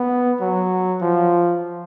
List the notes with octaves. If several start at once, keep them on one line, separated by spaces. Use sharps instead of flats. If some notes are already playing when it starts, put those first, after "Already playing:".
Already playing: B3
F#3
F3